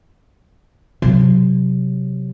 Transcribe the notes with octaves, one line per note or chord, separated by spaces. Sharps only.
C3 F#3